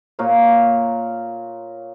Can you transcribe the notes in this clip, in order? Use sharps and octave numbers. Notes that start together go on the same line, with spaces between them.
A#2 A#4 C#5 F5